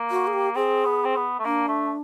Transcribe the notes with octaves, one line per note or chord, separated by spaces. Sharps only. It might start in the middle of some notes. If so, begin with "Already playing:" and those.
Already playing: A#3
F#4
G#4
G4
C4 G#4
B3
C4
B3
A3
A#3 D4
A3